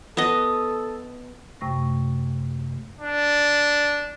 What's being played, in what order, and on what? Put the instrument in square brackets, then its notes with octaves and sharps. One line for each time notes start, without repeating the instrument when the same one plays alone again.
[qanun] B3 D#5 [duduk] A4
[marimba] F#2 C3 A3 G5 C#6 A#6
[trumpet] D4